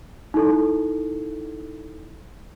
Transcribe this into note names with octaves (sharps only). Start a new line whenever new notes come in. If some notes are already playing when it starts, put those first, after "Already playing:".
D#4 E4 A4